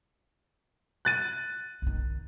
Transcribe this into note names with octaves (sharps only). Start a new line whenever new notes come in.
F#6 A6 D#7
B1 D#3